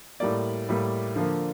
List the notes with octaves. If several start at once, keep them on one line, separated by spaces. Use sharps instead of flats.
A2 G3 A#3 D5
A2 G3 A#3
D3 F3 A#3